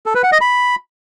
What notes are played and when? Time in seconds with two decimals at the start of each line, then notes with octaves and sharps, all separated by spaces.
0.06 A4
0.15 B4
0.23 F#5
0.32 D#5
0.41 B5